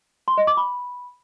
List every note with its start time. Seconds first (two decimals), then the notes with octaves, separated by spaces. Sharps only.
0.28 C6
0.38 D#5
0.47 D6
0.57 B5